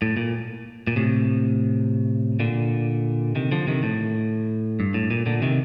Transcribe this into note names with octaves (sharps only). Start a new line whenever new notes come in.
A2
A#2
A#2
A2 C3
A#2 D3
C3 D#3
D3 F3
C3 D#3
A2
G2
A2
A#2
A#2 D3
C3 D#3